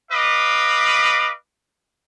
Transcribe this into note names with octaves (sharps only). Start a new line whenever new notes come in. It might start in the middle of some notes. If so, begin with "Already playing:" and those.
B4 D#5 F5 D6